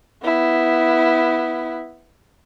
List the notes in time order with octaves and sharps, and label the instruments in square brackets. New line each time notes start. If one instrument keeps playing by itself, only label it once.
[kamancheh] B3 E4